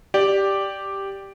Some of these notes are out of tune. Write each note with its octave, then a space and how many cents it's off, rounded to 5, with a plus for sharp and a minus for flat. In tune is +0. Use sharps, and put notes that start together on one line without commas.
G4 +0 D5 +0